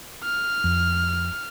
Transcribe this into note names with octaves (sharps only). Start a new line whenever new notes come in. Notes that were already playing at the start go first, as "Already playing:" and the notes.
F6
F2